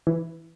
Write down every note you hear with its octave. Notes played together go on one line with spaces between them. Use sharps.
E3